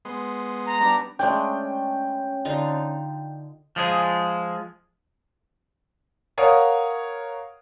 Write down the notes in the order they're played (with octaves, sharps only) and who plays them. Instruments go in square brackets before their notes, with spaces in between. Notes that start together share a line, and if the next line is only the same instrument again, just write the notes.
[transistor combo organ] G#3 B3 C6
[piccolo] A#5
[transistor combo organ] G3 B3 D4
[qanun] G#3 A3 D4 [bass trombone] C#4 [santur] G5
[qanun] D3 D#4 F4
[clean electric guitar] F3 G#3 G#4
[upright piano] A#4 C#5 F5 F#5 D#6